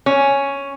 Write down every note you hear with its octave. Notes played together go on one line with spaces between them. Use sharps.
C#4